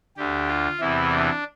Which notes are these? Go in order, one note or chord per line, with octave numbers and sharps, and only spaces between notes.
D2 D3 G4
F4
E2 C3 E3 E4
D4